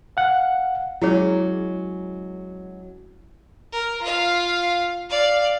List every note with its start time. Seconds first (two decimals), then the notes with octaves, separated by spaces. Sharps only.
0.17 F5 F#5
1.02 F#3 G#3 C#4 E4 G#4 C#5
3.72 A#4
4.02 F4 F5
5.09 D5 F5